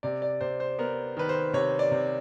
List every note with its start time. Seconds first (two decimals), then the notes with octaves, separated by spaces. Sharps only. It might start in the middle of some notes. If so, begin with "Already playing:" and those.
0.03 C3 D5
0.22 D5
0.41 C3 C5
0.60 C5
0.79 B3 A#4
1.17 D#3 B4
1.29 C5
1.53 C3 C#5
1.79 D5
1.91 C3